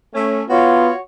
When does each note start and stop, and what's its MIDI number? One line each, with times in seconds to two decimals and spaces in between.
0.14 0.43 57
0.14 0.43 61
0.50 0.91 59
0.50 0.92 65
0.50 0.98 66
0.50 0.98 73